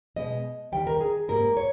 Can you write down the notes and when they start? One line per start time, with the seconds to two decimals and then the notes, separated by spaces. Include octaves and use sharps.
0.16 B2 G#3 B3 D#5
0.72 D#2 D#3 G3 G5
0.87 A#4
1.01 G#4
1.28 G#2 G3 A#3 A#4
1.57 C#5